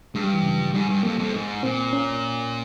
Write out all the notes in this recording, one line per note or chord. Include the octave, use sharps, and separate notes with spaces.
G2 G#3
G3
E3
C#3
F3
G#2 G3
G2
F2 A#3
F2
G#2
A#2 C4
C#4